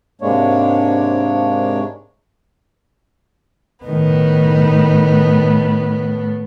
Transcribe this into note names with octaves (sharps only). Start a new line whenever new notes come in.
G#2 C3 G#3 A#3 D4 C#5
A2 D#3 B3 D#4